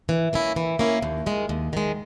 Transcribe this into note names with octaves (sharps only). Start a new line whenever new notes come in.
E3
A#3 C#4 E4
E3
A#3 C#4 E4
D#2
D#3 G#3
D#2
D#3 G#3